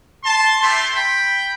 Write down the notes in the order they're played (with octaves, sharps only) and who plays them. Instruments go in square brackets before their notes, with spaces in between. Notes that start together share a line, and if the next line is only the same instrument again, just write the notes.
[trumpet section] A5 C6
A3 E4 G4 A5 C6
G5 B5